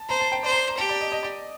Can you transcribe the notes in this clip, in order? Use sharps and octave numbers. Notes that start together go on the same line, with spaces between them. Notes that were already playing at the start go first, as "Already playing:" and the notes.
Already playing: A5
C5 A#5
A5
G5
C5 D5
A#5
A#5
G4 A5
D5
D#5
D#5
D5